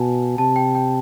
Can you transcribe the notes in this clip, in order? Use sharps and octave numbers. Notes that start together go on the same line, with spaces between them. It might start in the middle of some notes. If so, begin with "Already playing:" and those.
Already playing: B2 F#5 G#5 A5
C3 A5
G5
G5